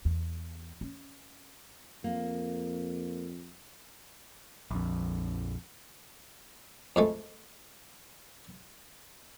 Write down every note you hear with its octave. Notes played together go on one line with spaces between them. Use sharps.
E2
C#4
F2 A#3
A#1 F2
F2 G#3 A3